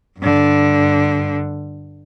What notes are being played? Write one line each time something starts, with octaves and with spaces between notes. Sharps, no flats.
G2 D3